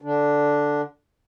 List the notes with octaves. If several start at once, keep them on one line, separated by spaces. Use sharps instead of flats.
D3 D4